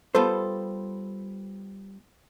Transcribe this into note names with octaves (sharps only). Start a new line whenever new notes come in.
G3 B3 F4 A4 C5